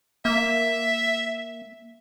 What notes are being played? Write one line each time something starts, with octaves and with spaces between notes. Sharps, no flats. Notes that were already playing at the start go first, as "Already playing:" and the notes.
A#3 E5